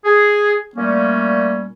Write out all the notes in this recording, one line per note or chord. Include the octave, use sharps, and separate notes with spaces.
G#4
A#2 G3 A3 A#3 C#4